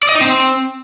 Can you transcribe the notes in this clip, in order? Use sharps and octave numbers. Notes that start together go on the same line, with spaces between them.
D5
D#5
D#4
C4